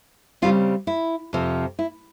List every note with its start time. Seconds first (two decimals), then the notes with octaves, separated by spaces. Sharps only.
0.42 C#3 G3 C4 F4
0.87 E4
1.33 F2 C3 F3
1.79 E4